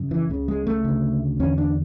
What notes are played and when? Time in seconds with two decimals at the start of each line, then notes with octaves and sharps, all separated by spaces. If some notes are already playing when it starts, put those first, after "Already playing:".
Already playing: F#2 C#3
0.11 E3
0.30 C#2 C#3
0.48 G#3
0.67 A3
0.84 D2 C#3
1.40 E2 D3 C#4
1.58 D4